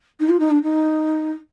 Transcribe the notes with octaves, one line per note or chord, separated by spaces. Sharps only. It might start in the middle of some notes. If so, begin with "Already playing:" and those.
D#4
F4
D#4
D4
D#4